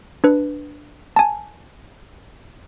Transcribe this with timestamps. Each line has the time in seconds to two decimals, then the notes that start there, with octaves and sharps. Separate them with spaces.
0.24 D4 B4
1.16 G#5 A5